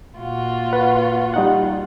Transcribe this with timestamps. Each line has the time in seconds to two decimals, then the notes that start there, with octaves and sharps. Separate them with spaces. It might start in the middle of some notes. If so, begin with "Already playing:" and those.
0.19 A#2 F4 F#4
0.73 B4 F#5
1.34 G3 D#4 F#5